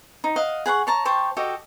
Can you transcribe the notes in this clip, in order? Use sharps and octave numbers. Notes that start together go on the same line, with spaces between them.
D#4
D#5 F5 F#5
G#4 F#5 B5 C#6
C#5 A5 A#5
G4 C5 A5 C#6
F#4 G4 A4 D#5